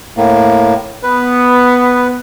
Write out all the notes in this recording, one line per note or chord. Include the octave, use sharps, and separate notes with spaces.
A2 A#3
B3 B4